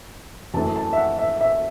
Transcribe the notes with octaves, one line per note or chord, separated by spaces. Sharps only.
F#2 E3 A3 A5
A5
E5
F#5
E5
E5